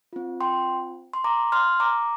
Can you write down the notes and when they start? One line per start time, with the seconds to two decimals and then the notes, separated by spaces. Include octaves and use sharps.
0.13 C4 F4
0.41 G5 C6
1.13 C6
1.24 A#5 D6
1.52 C6 F6
1.80 A#5 D6